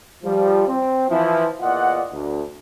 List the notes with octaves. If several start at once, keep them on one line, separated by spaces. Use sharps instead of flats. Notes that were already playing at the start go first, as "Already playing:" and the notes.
F3 G3
C4
E3 F3 E4
E2 A#2 F4 D5 D#5 F#5
D2